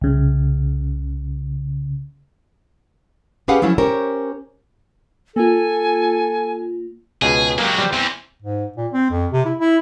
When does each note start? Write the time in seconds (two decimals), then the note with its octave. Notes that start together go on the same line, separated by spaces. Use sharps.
0.01 C2 C#3
3.48 C#4 G4 G#4 B4 F5 F#5
3.62 F3 F#3 A3 C#4 E4
3.78 C#4 G4 A#4 C5 C#5
5.36 A#3 F4 A4 G#5
7.22 C#2 B2 G#4
7.58 F#3 G#3 A#3 G4
7.79 G3 C5
7.93 E2 C4
8.42 G#2
8.77 A#2
8.93 C4
9.10 F2
9.32 C3
9.45 E4
9.58 E4